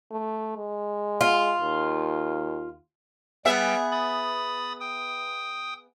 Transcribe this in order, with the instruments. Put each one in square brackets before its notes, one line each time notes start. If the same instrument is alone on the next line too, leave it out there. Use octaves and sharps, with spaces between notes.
[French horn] A3
G#3
[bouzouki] F4
[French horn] D#2
[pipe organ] G3 G5 [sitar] B3 G#4 E5
[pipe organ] B5 D#6 A6
G5 D#6